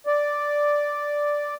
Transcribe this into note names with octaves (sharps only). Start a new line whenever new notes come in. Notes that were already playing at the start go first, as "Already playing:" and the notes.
D5